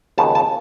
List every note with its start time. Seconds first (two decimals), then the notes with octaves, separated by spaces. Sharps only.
0.18 D#2 C#3 F3 G#3 B3 A5
0.35 A5